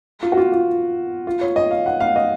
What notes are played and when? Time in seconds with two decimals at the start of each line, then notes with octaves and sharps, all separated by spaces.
0.23 F4
0.32 F#4
0.37 F4
0.52 F4
1.27 F4
1.41 C#5
1.56 D#5
1.71 F5
1.86 F#5
2.00 F5
2.16 D#5